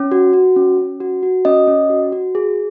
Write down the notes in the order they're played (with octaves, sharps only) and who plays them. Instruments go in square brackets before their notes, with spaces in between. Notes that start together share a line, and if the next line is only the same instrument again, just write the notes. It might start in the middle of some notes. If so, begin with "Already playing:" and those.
Already playing: [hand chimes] C#4
F#4
F#4
C#4
C#4
F#4
F#4
C#4 D#5
C#4
F#4
F#4
G#4